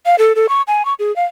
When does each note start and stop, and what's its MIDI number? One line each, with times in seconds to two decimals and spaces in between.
0.06 0.15 77
0.19 0.33 69
0.36 0.47 69
0.49 0.62 85
0.68 0.85 80
0.85 0.94 85
0.99 1.14 68
1.16 1.24 77